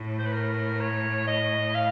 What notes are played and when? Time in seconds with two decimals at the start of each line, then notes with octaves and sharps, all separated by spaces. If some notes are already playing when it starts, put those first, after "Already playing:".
Already playing: A2
0.19 C5
0.26 B4
0.33 A#4
0.80 C#5
1.27 D#5
1.75 F5